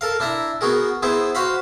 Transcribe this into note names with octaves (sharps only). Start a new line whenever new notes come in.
A4 A#4 F5
D4 E4 E5 A#5
B3 F#4 G#4 A#4
B3 E4 G#4 B4 C5
F#4 C5 F5 B5